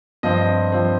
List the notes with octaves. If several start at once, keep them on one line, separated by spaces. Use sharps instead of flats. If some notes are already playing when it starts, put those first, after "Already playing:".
G2 F3 C4 D#5
F3 C4